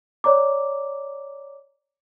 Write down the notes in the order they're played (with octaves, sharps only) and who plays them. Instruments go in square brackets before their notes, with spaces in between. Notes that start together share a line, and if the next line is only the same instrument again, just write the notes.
[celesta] C#5 D5 A#5 D6